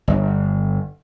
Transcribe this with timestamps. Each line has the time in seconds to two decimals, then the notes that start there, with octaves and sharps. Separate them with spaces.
0.08 G1